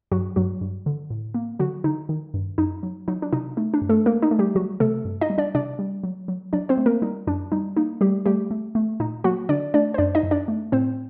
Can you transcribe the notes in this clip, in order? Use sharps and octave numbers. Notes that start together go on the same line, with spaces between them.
G2 F#3 F#4
G2 F#3 F#4
G2
D3
A2
A#3
D3 F#3 F#4
D3 D#4
D#3
G2
F#2 D#4
F#3
F#3 D#4
D4
C3 D#4
A3 D#4
D4
G2
A3 A4
A3 A#3 A#4
D#4
A3
G3 G4
F#3 G3 F#4
C3 A3 A4
G2
D#4 D#5
G3
D4 D5
C3 D4 D5
G3
F#3
F#3
F#3 D4 D5
C4 C5
A3
A#3 A#4
G3 D#4
F#2 D4
G3 D#4
A#3 D#4
G3 A3 G4
G3 A3 G4
A3
A3
A#2 D#4
F#3 A#3 F#4
D3 D4 D5
A3 D4 D5
C5
F#2 D4 D5
D#4 D#5
F#2
D4 D5
A3
A2 C4 C5